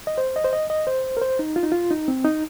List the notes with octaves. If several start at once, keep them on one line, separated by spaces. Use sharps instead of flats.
D#5
C5
D#5
C5
D#5
D#5
C5
A#4
C5
D#4
F4
D#4
F4
D#4
C4
D#4